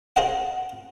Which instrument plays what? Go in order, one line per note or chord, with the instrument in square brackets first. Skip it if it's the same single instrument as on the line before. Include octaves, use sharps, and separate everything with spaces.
[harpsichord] G#4 A#4 C5 D#5 F5 F#5